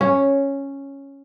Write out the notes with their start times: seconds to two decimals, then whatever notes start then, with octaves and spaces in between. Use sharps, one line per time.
0.01 C#4